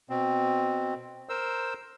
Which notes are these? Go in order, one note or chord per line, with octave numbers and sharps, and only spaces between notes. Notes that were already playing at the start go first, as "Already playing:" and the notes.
B2 C4
A#4 C5 E6